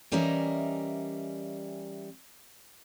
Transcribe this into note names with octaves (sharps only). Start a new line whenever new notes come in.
E3 G3 C#4 A#4 D#5 E5